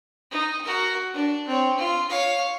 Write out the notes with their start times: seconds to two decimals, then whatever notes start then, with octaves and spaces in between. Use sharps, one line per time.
0.31 D#4
0.64 F#4 A#4
1.14 D4
1.47 C4 C#5
1.78 F4
2.10 C#5 F5